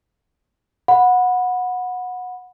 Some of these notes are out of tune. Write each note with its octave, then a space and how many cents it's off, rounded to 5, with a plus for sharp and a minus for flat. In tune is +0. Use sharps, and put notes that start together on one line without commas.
F#5 -20 B5 +0